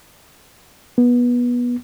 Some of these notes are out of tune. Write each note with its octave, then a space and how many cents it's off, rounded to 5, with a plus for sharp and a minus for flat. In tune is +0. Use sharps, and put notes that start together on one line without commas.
B3 -20